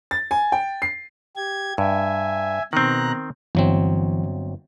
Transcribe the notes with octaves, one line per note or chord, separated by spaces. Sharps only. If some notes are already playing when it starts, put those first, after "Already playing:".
A6
G#5
G5
C7
G4 G#6
G2 E5 G#5
B2 D#3 C4 A#5 F#6
G1 E3 F#3 C4